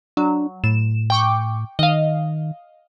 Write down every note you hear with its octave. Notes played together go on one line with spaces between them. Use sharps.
F#3 D4
A2 E7
G5 C#6 D6
D#3 D#5 F5